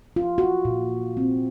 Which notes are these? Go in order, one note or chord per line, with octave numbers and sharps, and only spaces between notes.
F4
F#4
A#2
C4